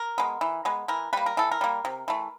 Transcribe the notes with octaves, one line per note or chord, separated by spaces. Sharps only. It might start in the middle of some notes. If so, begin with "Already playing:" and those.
Already playing: A#4
G#3 B3
E3
G#3 B3
E3 A#4
G3 A#3 B4
A#4
E3 A4
A#4
G3 A#3
C3
E3 A3